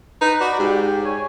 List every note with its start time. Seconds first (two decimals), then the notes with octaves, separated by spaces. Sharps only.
0.21 D#4 B4
0.41 F#4 D5
0.59 G#2 G4
1.05 C#5 G#5